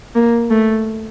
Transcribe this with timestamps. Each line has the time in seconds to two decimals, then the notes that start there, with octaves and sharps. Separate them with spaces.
0.15 A#3
0.50 A3